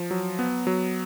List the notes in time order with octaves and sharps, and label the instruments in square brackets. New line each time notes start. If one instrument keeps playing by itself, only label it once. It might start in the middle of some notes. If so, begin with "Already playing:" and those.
Already playing: [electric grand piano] F3
F#3
B3
F#3